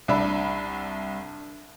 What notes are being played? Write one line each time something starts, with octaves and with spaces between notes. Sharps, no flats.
C2 D4 E5 B5